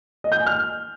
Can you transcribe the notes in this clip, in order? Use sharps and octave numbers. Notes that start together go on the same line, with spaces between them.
D#5
G6
G#5
F6